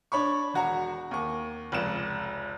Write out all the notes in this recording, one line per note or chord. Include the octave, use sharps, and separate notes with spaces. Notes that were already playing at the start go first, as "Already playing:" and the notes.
D4 C#5 B5 C#6
E1 F#4 A#5
D#2 C#6
F1 C#2 E7